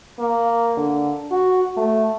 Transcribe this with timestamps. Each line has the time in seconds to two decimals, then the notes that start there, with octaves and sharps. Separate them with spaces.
0.19 A#3
0.77 D3
1.31 F#4
1.77 A3